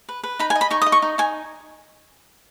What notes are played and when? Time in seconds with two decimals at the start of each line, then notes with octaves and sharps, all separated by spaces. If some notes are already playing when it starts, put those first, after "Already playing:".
0.09 B4
0.23 B4
0.39 D#4 B5
0.50 G#5
0.55 D#5
0.61 B5
0.71 D#4 C#6
0.82 D#6
0.86 D#5
0.92 C#6
1.02 D#4
1.18 D#4 G#5